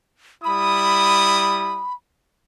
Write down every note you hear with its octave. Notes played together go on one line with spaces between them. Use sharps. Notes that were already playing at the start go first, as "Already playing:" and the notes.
G3 E4 B5 D#6